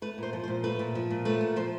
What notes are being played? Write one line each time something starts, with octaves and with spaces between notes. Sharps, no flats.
A3 B4
A#2 C5
F3
C5
A#2
A3 B4
A#2
F3
A#2
A3 B4
A#2
F3 C5